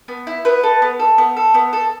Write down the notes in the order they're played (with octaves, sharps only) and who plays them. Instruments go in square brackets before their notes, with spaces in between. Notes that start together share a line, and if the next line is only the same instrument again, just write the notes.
[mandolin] B3
E4
B3 B4
A4
B3
A4
B3
A4
B3
A4